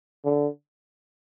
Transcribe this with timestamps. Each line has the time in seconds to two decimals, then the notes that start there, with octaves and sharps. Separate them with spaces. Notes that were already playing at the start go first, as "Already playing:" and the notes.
0.24 D3